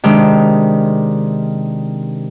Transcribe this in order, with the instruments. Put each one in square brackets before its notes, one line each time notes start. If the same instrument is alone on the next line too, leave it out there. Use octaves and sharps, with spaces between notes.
[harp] C3 D#3 G#3 D4